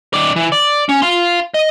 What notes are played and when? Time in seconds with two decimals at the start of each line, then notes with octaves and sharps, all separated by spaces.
0.14 D#3 D5
0.36 E3
0.52 D5
0.89 C#4
1.02 F5 C6
1.54 D#5